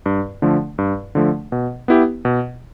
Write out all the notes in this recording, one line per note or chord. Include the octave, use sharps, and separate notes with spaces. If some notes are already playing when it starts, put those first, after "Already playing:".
G2
D3 F3 A3
G2
D3 F3 A3
B2
B3 E4 G4
B2